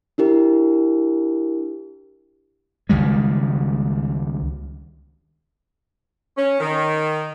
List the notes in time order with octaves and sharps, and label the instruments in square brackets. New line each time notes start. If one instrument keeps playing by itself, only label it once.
[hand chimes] D4 E4 G4 A#4
[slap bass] C#2 D#3 G3 G#3
[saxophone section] C#4
D#3